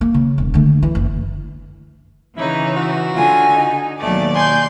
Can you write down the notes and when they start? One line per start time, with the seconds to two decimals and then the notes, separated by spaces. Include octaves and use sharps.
0.01 A#3
0.14 C#3
0.38 E1
0.54 D3 A3
0.83 E3
0.95 F#1
2.37 C#3 E3 D#4 E4 C#5
2.77 F#4
3.15 D3 F4 G#5
3.50 D#4
4.00 D#2 B2 F#3 A3 D5
4.35 G#5 C6 G6